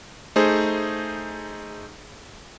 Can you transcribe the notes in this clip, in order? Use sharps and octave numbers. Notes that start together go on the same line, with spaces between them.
A3 D#4 G#4 C5